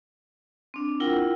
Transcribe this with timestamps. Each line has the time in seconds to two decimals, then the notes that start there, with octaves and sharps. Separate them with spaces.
0.74 C4 D4
1.00 E4 F4 A#4 F#5 G5